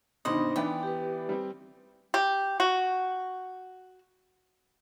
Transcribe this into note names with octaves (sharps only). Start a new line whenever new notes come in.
G1 B2 D#3 D4 D#4 C5 D#5 B5
E3 B3 D5 G5
G4 B4
G3 C4
G4
F#4